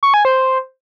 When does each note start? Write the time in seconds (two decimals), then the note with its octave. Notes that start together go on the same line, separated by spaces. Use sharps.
0.03 C#6
0.14 G#5
0.25 C5